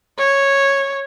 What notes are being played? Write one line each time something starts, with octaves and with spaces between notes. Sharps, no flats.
C#5